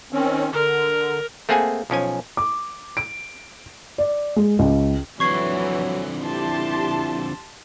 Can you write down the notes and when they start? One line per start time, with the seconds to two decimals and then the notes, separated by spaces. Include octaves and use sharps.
0.13 D#3 C4 C#4
0.52 D3 A#4
1.49 A3 A#3 C4 G#4 F#5 G#5
1.90 B1 F3 C#4 G#5
2.37 D6
2.97 D7
3.98 D5
4.36 G#3
4.59 C#2
5.20 F2 D3 E3 F#3 C#6 G#6 C7
6.23 E4 G4 A5 C6